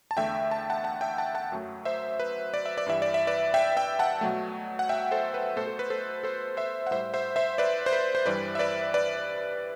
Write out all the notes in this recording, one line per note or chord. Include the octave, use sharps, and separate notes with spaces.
A5
E2 D3 A3 E5 G5
A5
F#5 A5
F#5 A5
E5 G5
F#5 A5
F#5 A5
F#2 F#3 A3
C5 E5
B4
D5
E5
D5
G2 E3 G3 E5
D5
E5
B4 D5
E5 G5
E5 G5
F#5 A5
B2 F#3 A3
F#5
E5 G5
A4 C5
B4
B2 A3 A4 C5
A4
B4
A4 C5
A4 C5
C5 E5
F#5
A2 G3 C5 E5
C5 E5
C5 E5
B4 D5
C5
B4
C5
G2 E3 G3 B4 D5
E5
B4 D5
B4 D5